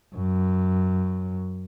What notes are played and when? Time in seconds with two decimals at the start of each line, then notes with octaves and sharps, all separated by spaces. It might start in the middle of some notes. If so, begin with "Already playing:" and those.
0.16 F#2